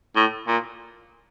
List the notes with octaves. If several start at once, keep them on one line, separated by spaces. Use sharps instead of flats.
A2
A#2